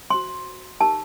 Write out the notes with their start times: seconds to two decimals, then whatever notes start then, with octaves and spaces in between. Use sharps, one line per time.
0.10 F#4 C5 C6
0.80 D#4 G4 A#4 A5